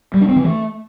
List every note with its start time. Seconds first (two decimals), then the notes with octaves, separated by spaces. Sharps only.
0.14 G3
0.21 D4
0.29 C4
0.36 E3
0.44 A3